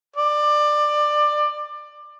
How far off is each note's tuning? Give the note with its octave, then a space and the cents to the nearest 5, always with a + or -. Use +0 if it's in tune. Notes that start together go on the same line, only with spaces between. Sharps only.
D5 +20